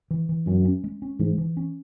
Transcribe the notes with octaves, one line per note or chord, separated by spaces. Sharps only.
E3
E3
F#2 C#4
C#4
G#3
C#4
G#2 E3
E3
C#4